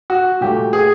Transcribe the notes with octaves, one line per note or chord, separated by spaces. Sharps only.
F#4
A#2 F#3 A3 G4
G#4